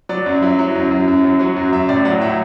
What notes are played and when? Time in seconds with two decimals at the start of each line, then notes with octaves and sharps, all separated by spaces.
0.09 F#3 D5
0.26 F#2
0.42 F#3 E4
0.59 F#3
0.75 F#2
0.91 F#2
1.08 F#2
1.24 F#3
1.39 F#3 F#4
1.56 F#2
1.73 F#2 E5
1.89 A2 D5
2.05 F#3 F#5
2.21 A2 E5